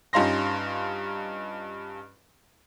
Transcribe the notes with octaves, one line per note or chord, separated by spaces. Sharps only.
G2 C#4 D#4 F4 C6 A#6